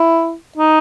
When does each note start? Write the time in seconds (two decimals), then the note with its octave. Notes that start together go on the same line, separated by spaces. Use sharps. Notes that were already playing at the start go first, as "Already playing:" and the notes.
Already playing: E4
0.58 D#4